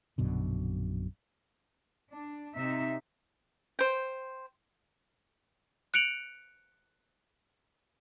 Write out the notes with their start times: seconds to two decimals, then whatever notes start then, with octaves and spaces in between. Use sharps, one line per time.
0.18 A#1 F#2 B2 D3
2.13 D4
2.55 C3 D#4 E5
3.79 C5 G5
5.94 F#6 C#7 D7 F7 F#7